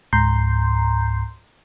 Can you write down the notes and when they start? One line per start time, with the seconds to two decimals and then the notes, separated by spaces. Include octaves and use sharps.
0.13 C#2 G#2 A#5 C6 G6 C7